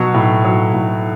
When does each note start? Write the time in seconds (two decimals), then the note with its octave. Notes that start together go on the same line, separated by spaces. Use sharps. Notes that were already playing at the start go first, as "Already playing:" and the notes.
Already playing: B2 F#3
0.14 A2
0.44 F#3
0.73 A2